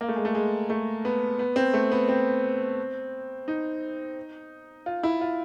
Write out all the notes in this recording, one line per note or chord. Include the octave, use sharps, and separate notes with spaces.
A#3
A3
G#3
A3
G#3
A3
B3
B3
C4
A3
B3
C4
D#4
F4
E4
F4